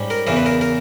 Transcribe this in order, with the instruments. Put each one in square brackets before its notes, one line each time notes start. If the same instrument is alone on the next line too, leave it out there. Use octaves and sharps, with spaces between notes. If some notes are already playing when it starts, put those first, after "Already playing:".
Already playing: [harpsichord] G#2 G3 C#4
A#4
E2 C#3 E3 A#4
B4
A#4
A#4